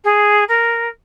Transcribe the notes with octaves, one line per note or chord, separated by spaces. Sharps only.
G#4
A#4